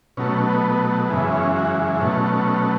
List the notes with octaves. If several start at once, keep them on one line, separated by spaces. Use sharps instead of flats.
B2 F#3 A3 C#4
B3
B3
A3
F#2 C#3 E3 G#3 B3
C#4
F#4
B2 F#3 A3 C#4